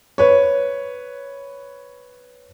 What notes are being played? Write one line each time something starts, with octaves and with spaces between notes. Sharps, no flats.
B4 C#5